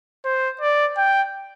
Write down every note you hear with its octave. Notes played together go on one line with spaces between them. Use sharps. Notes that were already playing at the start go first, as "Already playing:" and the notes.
C5
D5
G5